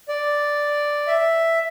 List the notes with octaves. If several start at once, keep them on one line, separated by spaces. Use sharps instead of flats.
D5
E5